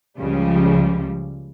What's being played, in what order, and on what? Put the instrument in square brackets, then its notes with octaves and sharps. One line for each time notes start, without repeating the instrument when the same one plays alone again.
[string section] C#2 C#3 F3 G3